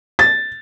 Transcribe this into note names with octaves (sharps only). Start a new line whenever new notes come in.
A6